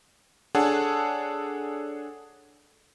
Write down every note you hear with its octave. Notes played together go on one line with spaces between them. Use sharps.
D4 G#4 A4 C#5 F#5 A5